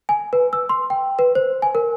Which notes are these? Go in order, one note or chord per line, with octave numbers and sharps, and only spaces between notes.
G#5
B4
E6
C6
G5
B4
C5
G#5
A#4